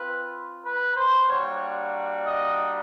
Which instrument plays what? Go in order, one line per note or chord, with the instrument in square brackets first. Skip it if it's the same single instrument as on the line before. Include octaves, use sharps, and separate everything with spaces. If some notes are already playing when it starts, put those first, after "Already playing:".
Already playing: [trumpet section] C4 F4 B4
B4
C5
G3 A#3 D4 F#4 C#5
D#5